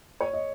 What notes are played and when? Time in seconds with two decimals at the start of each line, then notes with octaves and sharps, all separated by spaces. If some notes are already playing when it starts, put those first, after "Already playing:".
0.21 C#5
0.34 D#5